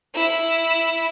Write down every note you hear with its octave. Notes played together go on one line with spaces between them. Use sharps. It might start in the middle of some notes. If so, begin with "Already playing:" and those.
E4